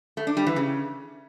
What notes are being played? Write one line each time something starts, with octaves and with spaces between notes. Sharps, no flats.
A3
D4
G3
E3
C#3